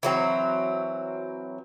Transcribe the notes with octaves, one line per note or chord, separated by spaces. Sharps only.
E3 F#3 C4